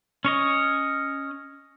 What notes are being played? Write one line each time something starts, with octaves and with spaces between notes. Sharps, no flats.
C#4 C#5 D#5